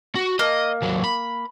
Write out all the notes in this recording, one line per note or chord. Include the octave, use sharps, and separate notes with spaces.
F#4
A#3 D#5
D#2 F#3
B5